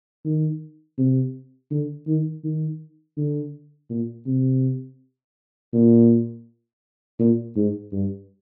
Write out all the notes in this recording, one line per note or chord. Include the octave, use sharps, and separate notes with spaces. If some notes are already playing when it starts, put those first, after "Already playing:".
D#3
C3
D3
D#3
D#3
D3
A#2
C3
A#2
A#2
G#2
G2